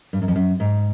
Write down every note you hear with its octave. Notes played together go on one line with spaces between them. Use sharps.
G2
F#2
F2
F#2
G#2